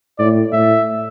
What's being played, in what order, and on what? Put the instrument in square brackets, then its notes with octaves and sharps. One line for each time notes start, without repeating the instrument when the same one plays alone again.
[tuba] A2 [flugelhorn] D5
[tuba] A2 [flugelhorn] E5